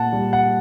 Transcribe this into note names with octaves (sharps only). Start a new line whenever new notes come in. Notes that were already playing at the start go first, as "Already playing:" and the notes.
Already playing: A#2 F#5 A5
G3
F#5